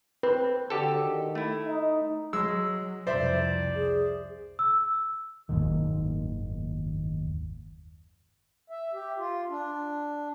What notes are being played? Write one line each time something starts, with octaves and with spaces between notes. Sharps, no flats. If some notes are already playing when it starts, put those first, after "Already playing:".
C4 B4
D3 F#4 G4 A4
D#3
A3 E4
D#4
F#3 G#3 E6
C2 F2 C5 D5 E5
G#4
E6
F#1 D#2 G#2 D#3
E5
G4
F4
D4